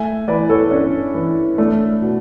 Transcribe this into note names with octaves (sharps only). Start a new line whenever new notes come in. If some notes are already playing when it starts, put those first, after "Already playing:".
Already playing: A3 E5 G#5
E3 B4 D5
A4 C#5
C#4 D4
E3
A3 D4
B2